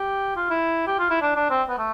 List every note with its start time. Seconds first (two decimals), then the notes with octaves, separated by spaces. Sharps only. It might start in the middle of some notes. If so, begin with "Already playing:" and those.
Already playing: G4
0.36 F4
0.50 E4
0.87 G4
0.99 F4
1.10 E4
1.22 D4
1.36 D4
1.50 C4
1.69 B3
1.78 A3